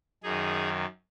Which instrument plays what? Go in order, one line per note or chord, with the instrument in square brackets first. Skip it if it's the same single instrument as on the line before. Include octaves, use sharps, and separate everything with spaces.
[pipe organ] F#2 D#3 D#4 G#4